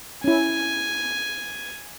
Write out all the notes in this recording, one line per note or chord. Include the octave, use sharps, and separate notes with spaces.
C#4 E4 G#5